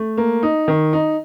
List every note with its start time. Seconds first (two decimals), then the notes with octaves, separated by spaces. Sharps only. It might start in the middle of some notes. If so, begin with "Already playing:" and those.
Already playing: A3
0.17 A#3
0.43 D#4
0.68 D#3
0.93 D#4